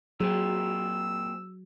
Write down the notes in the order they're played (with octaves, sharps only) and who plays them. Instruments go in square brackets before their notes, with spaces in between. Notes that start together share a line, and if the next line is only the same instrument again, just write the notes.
[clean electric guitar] A#2 C4 [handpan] F#3 [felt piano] G#4 [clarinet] E6